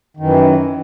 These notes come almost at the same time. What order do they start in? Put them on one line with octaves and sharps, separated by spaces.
D#3 F#2 E3